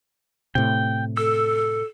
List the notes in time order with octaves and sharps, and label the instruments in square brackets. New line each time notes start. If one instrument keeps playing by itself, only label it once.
[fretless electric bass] A2 C3 [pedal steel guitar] G5
[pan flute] A4 [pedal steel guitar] E6